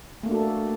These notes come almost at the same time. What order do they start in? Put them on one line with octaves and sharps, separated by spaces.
A3 A#3 D4 F#4 A4